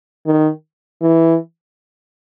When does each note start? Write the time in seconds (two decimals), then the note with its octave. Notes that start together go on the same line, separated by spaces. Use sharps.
0.27 D#3
1.02 E3